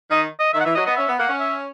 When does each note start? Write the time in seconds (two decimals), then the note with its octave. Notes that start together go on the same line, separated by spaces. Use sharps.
0.11 D#3 D#5
0.40 D#5
0.53 D#3 E5
0.60 F#5
0.65 E3 E5
0.75 F#3 D#5
0.86 B3 D#5
0.96 C#4 E5
1.08 B3
1.19 A#3 F#5
1.29 C#4
1.40 E5